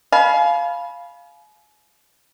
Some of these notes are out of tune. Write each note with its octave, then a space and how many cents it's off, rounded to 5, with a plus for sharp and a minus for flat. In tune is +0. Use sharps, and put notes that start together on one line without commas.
F5 +0 G#5 +40 B5 -10